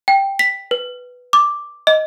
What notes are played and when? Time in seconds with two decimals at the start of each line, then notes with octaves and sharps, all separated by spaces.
0.08 G5
0.39 B6
0.71 B4
1.33 D6
1.87 D#5